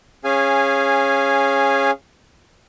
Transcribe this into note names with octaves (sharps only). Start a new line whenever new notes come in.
C#4 G#4 F5 G#5